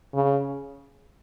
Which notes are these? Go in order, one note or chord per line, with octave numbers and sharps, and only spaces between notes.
C#3